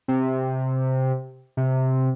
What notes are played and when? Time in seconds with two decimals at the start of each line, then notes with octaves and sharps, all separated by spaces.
0.08 C3
1.57 C3